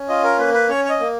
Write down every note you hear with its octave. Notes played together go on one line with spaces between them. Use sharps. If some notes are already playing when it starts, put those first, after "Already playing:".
Already playing: C#4
F4 D#5
A#4
A#3 B4
B4
C#4 C#5
C#5
D#5
A#3